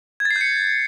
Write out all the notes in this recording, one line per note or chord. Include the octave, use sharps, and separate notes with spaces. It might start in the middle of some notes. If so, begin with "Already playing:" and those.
G#6
A6
C7
G6
C#7